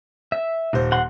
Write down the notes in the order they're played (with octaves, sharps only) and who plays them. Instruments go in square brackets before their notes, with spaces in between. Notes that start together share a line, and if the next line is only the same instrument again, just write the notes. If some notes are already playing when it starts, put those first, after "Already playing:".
[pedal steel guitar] E5
[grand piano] D#1 C5
[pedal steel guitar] F#5 C6